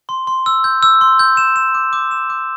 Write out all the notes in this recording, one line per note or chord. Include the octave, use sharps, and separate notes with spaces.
C6
C6
E6
G6
E6
C6
G6
E7
E7
D6
D6
E7
D6